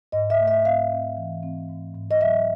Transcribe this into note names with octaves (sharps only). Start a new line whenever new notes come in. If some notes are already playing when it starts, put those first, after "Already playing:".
G#2 D#5
E5
A3
E5
C4 F5
C4
E3
C4
G#2
G#2
D#5
F#3 E5